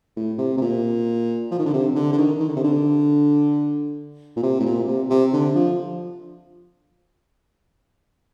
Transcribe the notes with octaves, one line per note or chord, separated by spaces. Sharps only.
A2
C3
C3
A#2
F3
D#3
D3
C3
D3
D3
D#3
D#3
D3
C3
D3
A#2
C3
A2
A#2
C3
C3
D3
F3